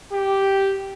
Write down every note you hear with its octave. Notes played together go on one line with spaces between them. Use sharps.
G4